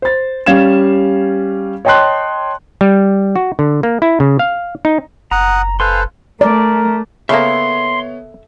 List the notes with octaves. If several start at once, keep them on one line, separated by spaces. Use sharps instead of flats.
C5 A6
G3 C#4 G4 F5 G#6 E7
C#5 D#5 G5 A5 C6 F#6
G3
F#4
D3
A#3
E4
C#3
F5
D#4
F#1 F#5 A#5 D#6
A4 B4 C5 F5 G#5 C6
A3 A#4 D5
C#3 A#3 B3 A4 C#5 E5 C6